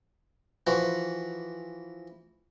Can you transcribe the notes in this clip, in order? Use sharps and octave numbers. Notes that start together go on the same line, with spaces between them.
E3 F3 F#4